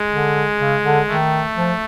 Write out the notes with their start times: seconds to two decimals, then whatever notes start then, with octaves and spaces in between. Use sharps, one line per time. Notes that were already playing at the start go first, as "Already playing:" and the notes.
Already playing: G#3
0.12 D3
0.59 C#3
0.83 D3
1.08 D#3 A3
1.56 F3